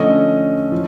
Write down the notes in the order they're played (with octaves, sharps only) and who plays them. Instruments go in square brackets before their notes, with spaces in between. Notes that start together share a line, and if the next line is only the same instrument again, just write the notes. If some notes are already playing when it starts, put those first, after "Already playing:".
Already playing: [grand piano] D3 F3 A3 C#4 D#5
F3